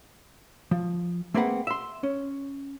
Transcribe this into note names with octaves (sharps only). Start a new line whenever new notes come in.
F3
A3 A#3 C4 G#4 B4 F#5
E5 C6
C#4